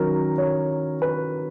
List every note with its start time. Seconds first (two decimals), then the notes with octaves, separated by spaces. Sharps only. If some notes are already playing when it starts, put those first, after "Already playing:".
Already playing: D#3 F#3 C#4 A#4
0.38 C#5
1.02 B4